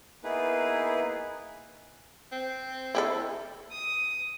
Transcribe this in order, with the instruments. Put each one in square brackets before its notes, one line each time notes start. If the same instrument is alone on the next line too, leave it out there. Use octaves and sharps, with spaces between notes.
[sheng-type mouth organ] A#3 B3 D#4 E4 G#4 B4
[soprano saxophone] C4
[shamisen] E4 G4 A4
[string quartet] D#6